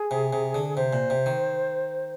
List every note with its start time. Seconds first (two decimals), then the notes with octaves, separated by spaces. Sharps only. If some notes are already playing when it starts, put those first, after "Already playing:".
Already playing: G#4
0.11 C3
0.33 C3
0.54 D3
0.77 C3 C5
0.93 A#2
1.10 C3
1.26 D#3